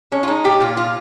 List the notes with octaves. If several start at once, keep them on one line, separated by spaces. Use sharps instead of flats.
G#3 C#4
F4
G#3 D#4
A#2 G4
A#2 F4
F3 F4